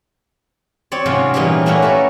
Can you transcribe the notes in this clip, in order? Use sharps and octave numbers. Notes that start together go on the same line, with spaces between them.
C4 C#5 D5
G#2 C3 F#3 C4 C#4 F4
A#2 E3 G3 D#4 G4
A3 A#3 C#4 E4 F#4 B4
E4 A4 A#4